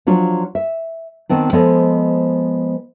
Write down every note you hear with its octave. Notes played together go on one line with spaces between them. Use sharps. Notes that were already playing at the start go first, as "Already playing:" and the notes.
F3 F#3 D4 F4
E5
D#3 B3 C4 D4
F3 G#3 B3 A4 C5 D#5